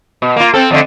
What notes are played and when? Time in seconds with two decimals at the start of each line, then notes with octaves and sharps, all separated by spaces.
0.22 B2
0.36 A#3 F4
0.54 C4 A4
0.71 F2 D3 A3